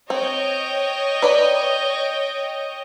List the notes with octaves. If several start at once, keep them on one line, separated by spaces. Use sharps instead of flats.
C4 C#5 D#5 G5
B4 D5 B5